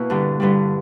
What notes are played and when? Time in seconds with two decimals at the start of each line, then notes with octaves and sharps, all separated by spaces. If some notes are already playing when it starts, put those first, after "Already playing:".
Already playing: B2 A#3 E4
0.10 G2 D3 G3
0.40 G2 D3 G3